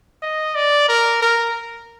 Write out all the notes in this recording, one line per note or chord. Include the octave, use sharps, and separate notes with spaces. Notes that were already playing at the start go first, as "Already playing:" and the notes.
D#5
D5
A#4
A#4